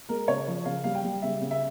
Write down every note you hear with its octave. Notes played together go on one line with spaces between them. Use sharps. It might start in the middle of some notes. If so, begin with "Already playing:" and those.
G#3 A#4
C#3 C#5
F3
C#3 F5
G3 F5
G5
G3
C#3 E5
C#3
E5